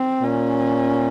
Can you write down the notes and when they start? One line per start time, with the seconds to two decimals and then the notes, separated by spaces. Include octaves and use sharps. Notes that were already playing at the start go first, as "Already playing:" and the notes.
Already playing: C4
0.22 A#2 C#4